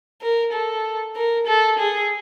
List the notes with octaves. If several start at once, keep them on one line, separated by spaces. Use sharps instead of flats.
A#4
A4
A#4
A4
G#4